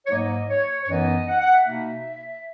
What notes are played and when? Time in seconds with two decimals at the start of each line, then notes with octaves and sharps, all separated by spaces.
0.05 C#5
0.10 G#2 F#3 A#3 D#4 D#5
0.49 C#5
0.82 C#5
0.88 F#2 E3 B3 D#4 D#5
1.27 F#5
1.40 F#5
1.51 E5
1.65 B2 A#3 D#4